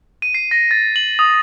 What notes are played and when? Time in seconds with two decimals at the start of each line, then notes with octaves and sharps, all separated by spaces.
0.22 D#7
0.35 C7
0.51 A#6
0.71 A6
0.96 F#7
1.19 D#6